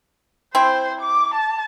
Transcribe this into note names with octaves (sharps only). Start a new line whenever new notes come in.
C4 E4 C5
D6
A5